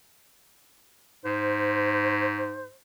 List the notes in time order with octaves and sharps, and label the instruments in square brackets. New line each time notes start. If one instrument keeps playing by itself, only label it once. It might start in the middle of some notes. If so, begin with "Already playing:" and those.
[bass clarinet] G#2 [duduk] C5